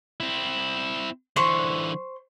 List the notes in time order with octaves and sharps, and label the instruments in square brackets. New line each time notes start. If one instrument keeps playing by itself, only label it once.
[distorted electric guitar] C4 E4
[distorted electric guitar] D3 E3 [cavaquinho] C5 C#6